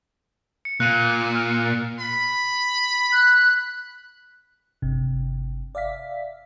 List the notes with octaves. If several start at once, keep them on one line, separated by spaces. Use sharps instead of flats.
C#7
A#2 F#6 C#7 D#7
F6
B5
F#6
G1 C3
D5 E5 F5 B6